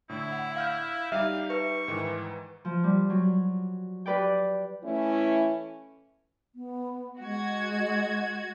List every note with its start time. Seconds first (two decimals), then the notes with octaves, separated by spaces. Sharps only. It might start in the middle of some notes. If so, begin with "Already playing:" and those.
0.09 A2 D3 E4
0.32 F#5
0.56 F5 F6 G6
1.12 G3 D#4 G4 E5 F5
1.50 B4 C#6
1.88 G#2 D#3 E3
2.65 F3
2.84 G3
3.10 F#3
4.06 G4 B4 D5 G5
4.84 E3 A3 C#4 E4
6.55 B3
7.20 G#3 F#4 G#6